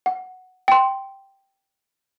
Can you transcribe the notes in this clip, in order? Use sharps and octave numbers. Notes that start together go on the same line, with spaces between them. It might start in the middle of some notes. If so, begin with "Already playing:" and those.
F#5
G5 C6